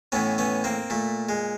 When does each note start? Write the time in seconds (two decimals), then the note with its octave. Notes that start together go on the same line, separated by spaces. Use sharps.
0.12 A2 E3 B3 C#4
0.38 B3 C#4
0.64 A#3 C4
0.90 A#2 A3
1.29 G#3